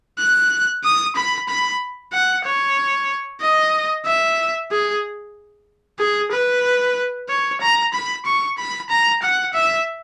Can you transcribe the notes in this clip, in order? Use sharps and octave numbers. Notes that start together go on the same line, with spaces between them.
F#6
D#6
B5
B5
F#5
C#5
D#5
E5
G#4
G#4
B4
C#5
A#5
B5
C#6
B5
A#5
F#5
E5